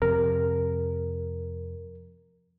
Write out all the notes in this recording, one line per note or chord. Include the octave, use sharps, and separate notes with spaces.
F2 C3 A#4